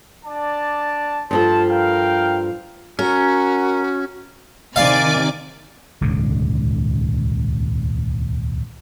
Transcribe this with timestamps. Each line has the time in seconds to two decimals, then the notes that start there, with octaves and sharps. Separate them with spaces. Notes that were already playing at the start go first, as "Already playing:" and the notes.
0.25 D4 D5 A5
1.31 G2 F3 F4 A4 C5 A5
1.69 A#4 F5 G5
2.99 C#4 F#4 A#4
4.76 C3 D#3 D5 F5 G#5 D6
6.01 D#1 C#2 G#2 D3